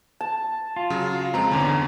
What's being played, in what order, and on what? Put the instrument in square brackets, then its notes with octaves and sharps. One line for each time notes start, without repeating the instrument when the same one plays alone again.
[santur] A5
[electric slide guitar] F4
[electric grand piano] C#3 F#3
[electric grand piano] F2 G#3 C4 [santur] A#5
[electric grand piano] G1 E2 C#4 [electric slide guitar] D3